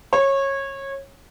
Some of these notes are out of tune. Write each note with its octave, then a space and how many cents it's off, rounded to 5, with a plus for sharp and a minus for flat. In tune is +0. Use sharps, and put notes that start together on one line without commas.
C#5 -20